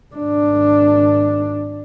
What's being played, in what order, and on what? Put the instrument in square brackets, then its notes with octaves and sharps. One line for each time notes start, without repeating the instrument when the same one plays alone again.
[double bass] G#1 D4